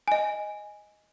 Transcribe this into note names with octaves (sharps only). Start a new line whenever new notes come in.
D#5 G#5